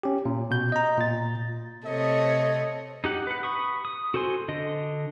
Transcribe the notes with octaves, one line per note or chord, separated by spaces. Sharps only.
C#4 G4
A#2
B2 G6
D#5 A#5
A#2 A6
C3 A3 C#5 D#5
D#4 G4 F#5
B4 F#5
B5 C#6 D#6
D#6
F#4 A4 C5 G#5 C6
D3 D#5